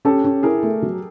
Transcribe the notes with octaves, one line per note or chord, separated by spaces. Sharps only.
C#4 G4 A4
C#4
E4 G#4 A#4
A3
F#3